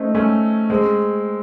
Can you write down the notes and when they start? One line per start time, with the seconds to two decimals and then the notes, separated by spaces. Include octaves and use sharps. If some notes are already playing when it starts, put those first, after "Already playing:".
Already playing: A3 C4 C#4 D#4
0.15 A3 C#4
0.70 G#3 C4